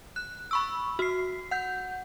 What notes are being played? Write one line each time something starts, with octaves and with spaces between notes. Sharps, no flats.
F#6
B5 C#6 E6
F#4 C7
F#5 G6